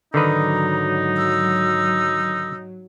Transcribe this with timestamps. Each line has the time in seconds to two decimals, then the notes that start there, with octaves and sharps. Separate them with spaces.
0.14 G#2 D3 D#3 F#3 D#4 B4 A#5
1.17 E6